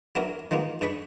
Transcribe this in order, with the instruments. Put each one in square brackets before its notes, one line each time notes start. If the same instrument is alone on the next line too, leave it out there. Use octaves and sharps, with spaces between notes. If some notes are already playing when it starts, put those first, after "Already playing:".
[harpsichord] F#3 B3 C#4 D4 E4 A#4
D#3 F3 G#3 A#3 B3
G2 D4 G#4 B4 B5 C#6